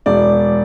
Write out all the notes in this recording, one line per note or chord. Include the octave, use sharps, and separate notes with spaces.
E1 D5